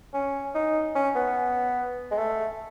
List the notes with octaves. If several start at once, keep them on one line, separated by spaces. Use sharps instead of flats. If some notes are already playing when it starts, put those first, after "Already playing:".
C#4
D#4
C#4
B3
G#3
A3